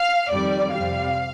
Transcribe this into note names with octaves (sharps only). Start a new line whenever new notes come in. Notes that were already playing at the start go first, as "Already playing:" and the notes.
Already playing: F5
F2 D#3 G3 D5
F2 C3 G3 F5